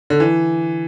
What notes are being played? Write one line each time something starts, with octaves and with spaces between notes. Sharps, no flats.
D3
E3